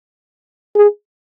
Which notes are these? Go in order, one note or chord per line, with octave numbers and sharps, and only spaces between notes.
G#4